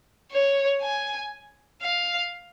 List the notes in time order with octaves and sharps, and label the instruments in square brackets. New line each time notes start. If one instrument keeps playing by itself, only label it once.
[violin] C#5
G#5
F5